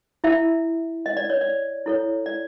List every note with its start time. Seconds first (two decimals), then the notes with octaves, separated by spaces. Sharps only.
0.24 E4 E5
1.06 D#5
1.17 D5
1.30 C#5
1.41 D5
1.86 E4 A4 C#5
2.26 D5